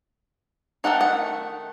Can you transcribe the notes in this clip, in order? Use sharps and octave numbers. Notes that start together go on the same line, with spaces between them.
D#3 A3 D#4 F#5
F#5